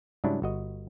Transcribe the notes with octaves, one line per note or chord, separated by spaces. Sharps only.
G#2 C#3 F#3 G3 D4 E4
G1 F#4 D#5